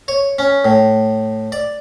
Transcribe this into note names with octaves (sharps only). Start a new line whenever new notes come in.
C#5
C#4
A2
D5